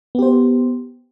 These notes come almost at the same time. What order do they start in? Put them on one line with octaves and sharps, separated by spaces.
B3 G4 C5